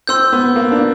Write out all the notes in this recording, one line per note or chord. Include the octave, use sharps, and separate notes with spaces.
C4 C6 E6 G6
B3
A#3
D4